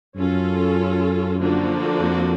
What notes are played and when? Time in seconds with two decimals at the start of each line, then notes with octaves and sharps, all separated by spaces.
0.16 F#2 C#4 F4 A4
1.39 D3 F3 A#3 D4 F#4
2.00 F2